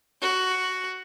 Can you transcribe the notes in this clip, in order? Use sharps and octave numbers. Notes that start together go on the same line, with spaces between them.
F#4